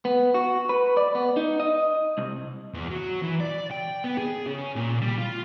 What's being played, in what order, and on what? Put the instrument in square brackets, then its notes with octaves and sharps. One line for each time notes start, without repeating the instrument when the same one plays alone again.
[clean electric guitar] B3
F#4
B4
D5
B3
D#4
D#5
C2
[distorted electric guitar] E2
F#3
E3
D5
G5
B3
G#4
C#3
A#2
G3
F4